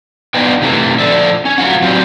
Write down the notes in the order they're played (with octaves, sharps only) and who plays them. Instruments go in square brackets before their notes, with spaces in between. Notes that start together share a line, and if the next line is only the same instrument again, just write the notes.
[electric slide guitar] B3 D4 D#4 F4 B4 G5
C3 E3 A3
F3 A4 D5 E5
C#4
F#3 A3 F4 F#5
F#3 C4 D4 F4 G4